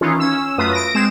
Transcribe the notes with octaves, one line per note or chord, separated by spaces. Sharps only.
D#3 E3 C#4 D#4 F4
C#4 E6
F#2 A3 F4 B4 D#6
A#6 D7
G#3 C4 E7